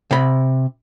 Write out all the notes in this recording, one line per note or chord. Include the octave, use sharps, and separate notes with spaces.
C3 B5